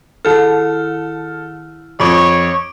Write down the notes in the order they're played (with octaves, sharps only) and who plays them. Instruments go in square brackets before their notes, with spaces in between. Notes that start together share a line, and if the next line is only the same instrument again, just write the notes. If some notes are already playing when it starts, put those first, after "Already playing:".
[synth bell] D#3 E4 F6 [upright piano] A4
[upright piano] F2 [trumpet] C#5 [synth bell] C#6 D6 D7